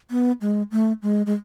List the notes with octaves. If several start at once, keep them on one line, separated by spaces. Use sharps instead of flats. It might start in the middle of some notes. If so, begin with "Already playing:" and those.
B3
G#3
A3
G#3
G#3